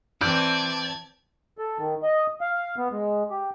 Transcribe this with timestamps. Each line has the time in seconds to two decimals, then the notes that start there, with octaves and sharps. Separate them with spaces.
0.21 E3 C4 D5 A5 G6 G#6
1.58 A4
1.78 D#3
2.03 D#5
2.41 F5
2.78 B3
2.92 G#3
3.31 G4